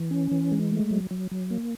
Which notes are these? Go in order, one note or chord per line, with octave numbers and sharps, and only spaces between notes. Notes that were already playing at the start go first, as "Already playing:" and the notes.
Already playing: E3
C#4
E3
G#3
A3
F#3
F#3
F#3
A#3